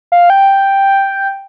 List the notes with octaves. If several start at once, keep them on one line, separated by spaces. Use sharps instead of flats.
F5
G5